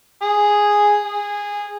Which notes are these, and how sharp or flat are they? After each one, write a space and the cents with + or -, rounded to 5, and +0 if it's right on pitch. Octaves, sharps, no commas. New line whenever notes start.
G#4 -5
G#4 -15